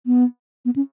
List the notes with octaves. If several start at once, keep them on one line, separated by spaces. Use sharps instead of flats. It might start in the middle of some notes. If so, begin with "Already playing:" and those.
B3
B3
C#4